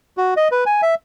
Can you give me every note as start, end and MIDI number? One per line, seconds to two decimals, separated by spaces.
0.17 0.34 66
0.37 0.48 75
0.52 0.64 71
0.66 0.81 80
0.82 0.95 76